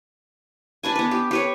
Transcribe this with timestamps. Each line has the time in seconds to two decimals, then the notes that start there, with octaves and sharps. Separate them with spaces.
0.83 D4 B4 G#5
0.95 B3 B4
1.11 G4
1.31 G4 B4 C#5